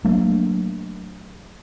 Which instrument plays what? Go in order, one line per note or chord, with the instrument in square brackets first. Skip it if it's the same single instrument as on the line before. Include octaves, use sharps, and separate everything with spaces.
[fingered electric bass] F#3 A3 A#3 D4